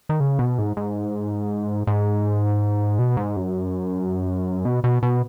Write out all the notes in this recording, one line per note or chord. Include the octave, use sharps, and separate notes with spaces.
D#3
C#3
B2
G#2
G#2
G#2
B2
G#2
F#2
B2
B2
B2